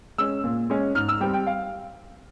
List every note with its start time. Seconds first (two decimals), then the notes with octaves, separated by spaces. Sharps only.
0.18 G#3 C#4 E6
0.44 A#2
0.70 G#3 C#4
0.95 G#2 F6
1.08 E6
1.21 G3 C4 G5
1.33 G5
1.47 F5